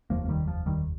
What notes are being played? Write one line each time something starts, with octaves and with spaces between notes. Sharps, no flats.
F1 D#2 F3 A#3
A#3
D#3 G3
F3
D#3 G3